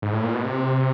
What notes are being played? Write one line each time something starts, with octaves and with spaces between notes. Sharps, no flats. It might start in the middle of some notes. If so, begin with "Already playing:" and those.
G#2
A2
A#2
B2
C3